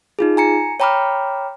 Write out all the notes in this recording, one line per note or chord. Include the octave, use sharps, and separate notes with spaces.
D#4 F4 G#4
G#5 A#5 C#7
C#5 G5 A#5 B5 D6 F6